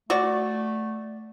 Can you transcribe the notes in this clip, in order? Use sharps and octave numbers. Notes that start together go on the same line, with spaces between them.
A3 F#4 D5